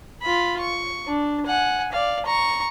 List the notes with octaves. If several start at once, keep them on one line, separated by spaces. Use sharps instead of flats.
F4 B5
C#6
D4
F#5 G#5
D5 F5
A#5 C#6